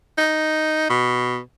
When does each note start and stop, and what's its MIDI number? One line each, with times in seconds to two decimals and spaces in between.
0.18 0.89 63
0.89 1.39 47